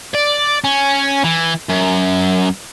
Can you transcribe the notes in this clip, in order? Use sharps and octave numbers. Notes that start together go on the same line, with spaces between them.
D5
C#4
E3
F#2